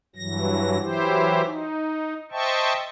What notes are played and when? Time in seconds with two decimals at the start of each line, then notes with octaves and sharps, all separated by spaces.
0.16 G2 E3 F#3 A#6
0.81 E3 F#3 E4 G4 C5
1.44 D#4
2.32 C5 D#5 E5 G5 A5 C#6